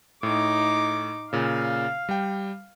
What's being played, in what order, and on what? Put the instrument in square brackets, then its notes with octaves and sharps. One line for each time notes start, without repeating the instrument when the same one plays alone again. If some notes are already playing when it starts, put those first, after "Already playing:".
[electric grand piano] A2 [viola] D#4 D6
[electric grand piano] A#2 C#3 [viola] F5
[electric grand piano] G3 G5